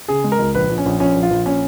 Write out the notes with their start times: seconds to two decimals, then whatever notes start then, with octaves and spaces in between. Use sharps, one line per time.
0.08 C#3 G#4
0.24 G#3
0.32 A#4
0.39 C#2
0.55 A#1 B4
0.69 A#1
0.78 C#4
0.86 A#1
1.00 A#1 C#4
1.16 A#1
1.23 F4
1.30 A#1
1.46 A#2 C#4